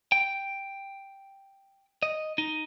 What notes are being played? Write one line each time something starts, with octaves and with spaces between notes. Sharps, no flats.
G5
D#5
D#4